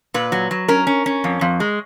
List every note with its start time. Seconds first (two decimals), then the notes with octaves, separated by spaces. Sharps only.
0.14 A#2 B4
0.32 F#3
0.51 F#3
0.68 C#4 A#4
0.87 C#4
1.06 C#4
1.24 F2
1.41 F2
1.60 G#3